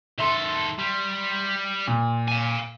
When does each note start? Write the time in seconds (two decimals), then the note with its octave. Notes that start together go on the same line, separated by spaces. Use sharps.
0.19 D#3 A4 E5 C6
0.79 G3
1.87 A#2
2.28 F5 G#5